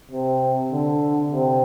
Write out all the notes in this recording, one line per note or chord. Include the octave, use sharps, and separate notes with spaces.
C3
D3
C3